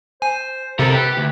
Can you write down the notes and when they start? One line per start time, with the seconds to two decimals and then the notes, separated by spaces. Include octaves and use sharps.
0.22 C5 G#5
0.79 C3 C4 A4 A#4
0.94 G4 B4
1.17 D2